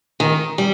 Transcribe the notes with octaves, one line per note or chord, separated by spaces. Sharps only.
D#3
G3